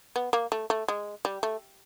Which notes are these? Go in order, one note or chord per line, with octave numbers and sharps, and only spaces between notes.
B3
A#3
A3
A3
G#3
G3
A3